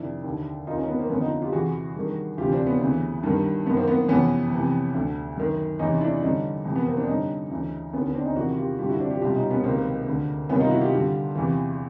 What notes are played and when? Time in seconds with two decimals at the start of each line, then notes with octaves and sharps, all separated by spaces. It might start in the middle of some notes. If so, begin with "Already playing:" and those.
Already playing: F2 C3 D#3 D4 E4
0.24 D#2 D3
0.67 D#2 D#3 D#4 F4
0.78 C#4 D#4
0.88 B3
0.99 A#3 C4
1.10 F2 D3 B3 C#4
1.21 D#4 F4
1.42 F4 G4
1.52 E2 C3 E3 F#4 G#4
1.95 G2 D#3
2.38 D2 C3 E3 F4 G4
2.52 C4 D4
2.66 B3 C#4
2.81 D2 C#3 E3
3.23 G2 D#3
3.66 F#2 B3
3.70 D#3
3.77 A#3 C4
3.88 B3
4.09 F2 C3 E3 B3 C#4
4.51 F2 C3 E3
4.94 D2 D3
5.37 F#2 D#3
5.79 E2 C3 E3 C#4 D#4
6.01 D4 E4
6.22 G2 D3 C#4 D#4
6.65 F2 C3 E3
6.75 B3
6.86 A#3 C4
6.97 C4 D4
7.07 G2 D3 C#4 D#4
7.50 D2 C#3 E3
7.93 D#2 D3 B3 C#4
8.04 B3 C#4
8.15 C4 D4
8.25 C#4 D#4
8.36 E2 C3 D#3 E4 F#4
8.57 F4 G4
8.79 G2 F4 G4
8.83 D3
8.89 E4 F#4
9.00 C4 D4
9.11 F4 G4
9.21 C2 B2 F4 G4
9.36 C#4 D#4
9.50 B3 C#4
9.64 C#2 C3 D#3 A#3 C4
10.07 D2 D3
10.49 C2 C3 D#3 B3 C#4
10.60 D#4 F4
10.71 E4 F#4
10.81 F4 G4
10.92 G2 D3
11.35 E2 C3 E3